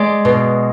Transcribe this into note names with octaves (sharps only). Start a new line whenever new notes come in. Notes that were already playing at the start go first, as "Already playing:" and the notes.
Already playing: G#3 D5
B2